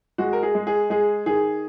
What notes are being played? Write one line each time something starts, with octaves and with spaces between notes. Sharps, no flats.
G#3 F#4
A#4
G#4
G#3
G#4
G#3 G#4
D#3 G#4